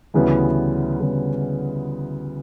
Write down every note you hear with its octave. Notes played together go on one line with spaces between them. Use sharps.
D2 C#3 E3 G3 B3
D2 C#3 E3 G3 B3